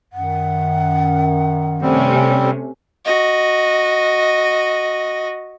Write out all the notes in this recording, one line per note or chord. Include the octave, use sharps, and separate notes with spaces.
F#2 D#3 F#5
C3 G3 A3 C4 C#4
F#4 D#5